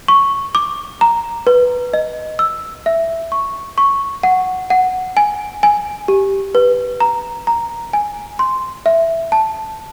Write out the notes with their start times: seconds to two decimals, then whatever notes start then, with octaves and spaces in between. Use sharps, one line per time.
0.08 C#6
0.55 D6
1.01 A#5
1.47 B4
1.94 D#5
2.39 E6
2.86 E5
3.32 C#6
3.78 C#6
4.23 F#5
4.70 F#5
5.17 G#5
5.63 G#5
6.08 G4
6.55 B4
7.00 A#5
7.47 A#5
7.93 G#5
8.39 C6
8.86 E5
9.32 A5